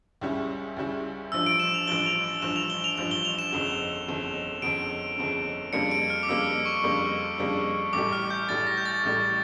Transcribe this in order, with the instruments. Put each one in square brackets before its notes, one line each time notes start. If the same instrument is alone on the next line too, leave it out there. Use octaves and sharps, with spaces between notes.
[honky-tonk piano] C#2 C#3 G3 C#4 E4
C#2 C#3 G3 C#4 E4
[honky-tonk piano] A1 G2 F3 [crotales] E6
[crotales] D7
E7
F7
[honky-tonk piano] A1 G2 F3 [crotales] G7
[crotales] F7
D7
[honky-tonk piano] A1 G2 F3 [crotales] E7
[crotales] F7
G7
F7
[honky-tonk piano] A1 G2 F3 [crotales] F7
[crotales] G7
F7
E7
[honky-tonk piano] G1 F2 C#3
G1 F2 C#3
[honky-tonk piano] G1 F2 C#3 [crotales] D7
[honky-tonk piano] G1 F2 C#3
[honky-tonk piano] F2 C#3 G3 A#3 D4 [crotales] C#7
[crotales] D7
F6
D6
[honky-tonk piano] F2 C#3 G3 A#3 D4 [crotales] E6
[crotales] C#6
[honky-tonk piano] F2 C#3 G3 A#3 D4
F2 C#3 G3 A#3 D4
[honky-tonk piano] A1 A2 G3 [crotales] D6
[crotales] F6
G6
[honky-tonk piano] A1 A2 G3 [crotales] A6
[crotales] A#6
G6
A6
[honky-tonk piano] A1 A2 G3